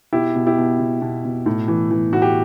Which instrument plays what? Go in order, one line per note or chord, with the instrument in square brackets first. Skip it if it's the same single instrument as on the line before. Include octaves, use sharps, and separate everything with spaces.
[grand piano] B2 E4 G4
B2
E4 G4
B2
B2
B2
B2
A2
E3
E3
A2 F#4
G4